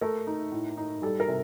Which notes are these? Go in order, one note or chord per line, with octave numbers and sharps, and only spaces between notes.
A3 A#4
D#4
A2
D#4
G3 A4
A#4
C3